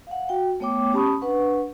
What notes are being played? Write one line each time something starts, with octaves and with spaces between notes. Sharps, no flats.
F5 F#5
F#4 G5
A3 B3 C#5 G5 D6
C#4 G4 A5 B5 C#6 D#6
D4 B4 F#5 C#6